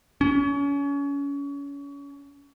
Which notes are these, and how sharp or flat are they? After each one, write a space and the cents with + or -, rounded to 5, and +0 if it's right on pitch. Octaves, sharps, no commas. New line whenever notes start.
C#4 +30